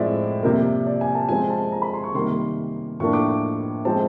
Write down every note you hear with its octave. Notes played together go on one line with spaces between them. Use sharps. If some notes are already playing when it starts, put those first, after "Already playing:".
Already playing: A2 F3 G#3 C4 E4 D5 E5
C3 F3 A#3
D5
G#5
A5
F3 G#3 C4 F4 G#5
A5
A#5
B5
C6
C#6
C3 D#3 G3 A#3 C6
A2 F3 A#3 D4 C#6
D6
D6
F3 G#3 C4 A5